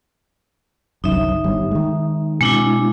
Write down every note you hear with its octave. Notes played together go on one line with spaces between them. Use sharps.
G1 C2 F#2 D#4 E5
G1 G3
D#3 G#3
B2 G#3 C4 D4 E4